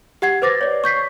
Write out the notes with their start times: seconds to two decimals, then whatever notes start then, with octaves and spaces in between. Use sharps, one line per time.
0.22 G4 F#5 G#6 C7
0.42 B4 C5 D6 A6 A#6
0.61 C#5 D5
0.84 C#6 G6 B6 C7